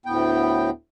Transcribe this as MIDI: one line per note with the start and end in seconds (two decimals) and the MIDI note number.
0.06 0.70 38
0.06 0.70 45
0.06 0.70 59
0.06 0.70 79